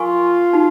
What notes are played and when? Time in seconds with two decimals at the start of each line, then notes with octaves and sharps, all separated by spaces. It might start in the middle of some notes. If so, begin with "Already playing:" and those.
Already playing: F4 A#4 F5 G#5 C#6
0.53 D#4 F#4